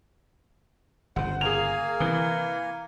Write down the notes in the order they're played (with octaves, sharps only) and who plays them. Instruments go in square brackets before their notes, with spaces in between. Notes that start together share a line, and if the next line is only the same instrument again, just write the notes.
[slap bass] G1 C#3 [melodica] C5 [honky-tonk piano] F#5
[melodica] A#3 A#4 G#5 [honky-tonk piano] G#4 F7
[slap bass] C3 [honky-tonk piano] E3